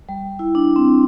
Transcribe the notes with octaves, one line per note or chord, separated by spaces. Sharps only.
G3
E4
D4
C4